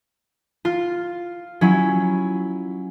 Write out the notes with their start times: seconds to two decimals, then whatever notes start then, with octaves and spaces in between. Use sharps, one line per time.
0.65 F4
1.61 F#3 C#4 E4